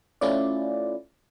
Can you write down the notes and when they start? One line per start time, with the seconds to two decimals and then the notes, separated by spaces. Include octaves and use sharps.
0.21 A3 C#4 E4 F4 D5